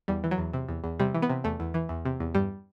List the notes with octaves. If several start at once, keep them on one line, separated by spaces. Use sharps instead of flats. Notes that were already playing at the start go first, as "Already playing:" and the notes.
E2 G3
E3
F#3
E2
C3
E2
E2
C3 G3
E3
B3
C3
E2 A3
E2
E3
E2
C3
E2
G2 G3